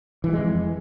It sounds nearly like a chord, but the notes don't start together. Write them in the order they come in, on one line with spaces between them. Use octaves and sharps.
E3 G3 G#3 F2